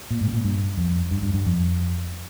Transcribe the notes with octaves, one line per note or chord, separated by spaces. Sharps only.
A#2
G#2
C3
A#2
G2
F2
G2
G2
G2
F2